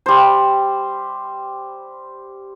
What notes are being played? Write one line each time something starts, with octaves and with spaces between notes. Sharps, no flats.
G3 C5